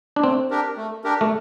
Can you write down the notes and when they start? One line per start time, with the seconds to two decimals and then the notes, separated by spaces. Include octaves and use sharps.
0.16 D4
0.24 A3 C4
0.51 D4 G4 A#4
0.77 A3
1.04 D4 G4 A#4
1.21 A3